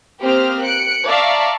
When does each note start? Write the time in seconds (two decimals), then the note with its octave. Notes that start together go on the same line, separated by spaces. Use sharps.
0.21 A#3 C4 G4 C5 D#6 F6
0.62 F#6 C#7 D7
1.06 D5 E5 F5 A5 A#5 C#6